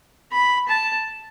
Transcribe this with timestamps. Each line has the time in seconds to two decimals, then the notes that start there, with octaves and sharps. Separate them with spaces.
0.32 B5
0.68 A5